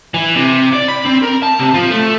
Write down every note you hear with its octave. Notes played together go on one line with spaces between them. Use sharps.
E3
C3
D5
B5
C4
A#4
A5
C3
F3
A3